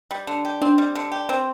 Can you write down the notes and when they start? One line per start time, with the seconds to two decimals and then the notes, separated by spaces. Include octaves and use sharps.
0.11 G3
0.27 D3
0.45 G4
0.62 C4 D4
0.78 G3
0.95 D3
1.12 G4
1.29 C4